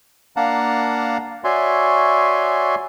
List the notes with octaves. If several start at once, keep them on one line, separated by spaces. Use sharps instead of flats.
A#3 D4 F5 F#5 A5 A#5
F#4 C#5 D5 E5 G#5 C6